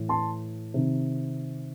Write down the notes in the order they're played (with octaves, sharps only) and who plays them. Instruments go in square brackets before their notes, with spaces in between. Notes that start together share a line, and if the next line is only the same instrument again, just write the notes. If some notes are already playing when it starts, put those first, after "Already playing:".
Already playing: [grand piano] A2 E3
A5 C6
C3 D#3